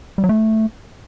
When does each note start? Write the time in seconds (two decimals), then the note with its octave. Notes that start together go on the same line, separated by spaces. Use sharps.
0.18 G3
0.24 F#3
0.29 A3